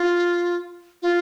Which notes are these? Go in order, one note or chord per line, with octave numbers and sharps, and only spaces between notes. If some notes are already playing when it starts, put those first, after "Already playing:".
Already playing: F4
F4